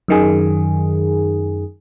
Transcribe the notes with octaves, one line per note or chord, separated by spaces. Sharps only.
F#2 D#3 G#4